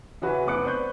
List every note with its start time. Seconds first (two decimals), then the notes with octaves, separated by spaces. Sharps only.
0.22 C#3 E3 F#4 B4 E5
0.46 F1 B3 B4 D6 F#6 C#7
0.64 B4 C5 D5 C#6 F#6 G6